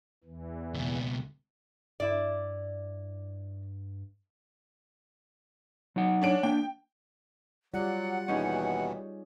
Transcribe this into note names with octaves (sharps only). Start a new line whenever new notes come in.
E2 E3
C#2 B2
G2 E4 D5
F#3 D#4 F#5
C#4 D4 D7
A#3 D4 G5
F#3 G3 F4 D5 F#5
D#2 B2 E3 C#4 D#4 G#4